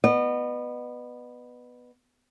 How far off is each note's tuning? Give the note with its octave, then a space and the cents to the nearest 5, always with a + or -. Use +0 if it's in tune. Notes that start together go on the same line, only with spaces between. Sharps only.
B3 +0 D#5 -35